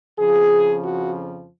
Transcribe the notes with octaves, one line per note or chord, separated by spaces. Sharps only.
F2 C#3 F3 G#4
F#4